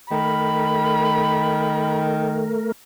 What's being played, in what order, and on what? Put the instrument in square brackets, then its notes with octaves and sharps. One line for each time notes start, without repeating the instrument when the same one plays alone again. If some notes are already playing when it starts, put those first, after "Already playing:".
[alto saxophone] D#3 [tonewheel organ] A3 A#4 [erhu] B5